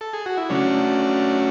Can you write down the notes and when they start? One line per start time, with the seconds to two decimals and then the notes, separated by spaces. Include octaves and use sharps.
0.01 A4
0.13 G#4
0.26 F#4
0.37 E4
0.50 C#3 F#3 A3 C#4 D4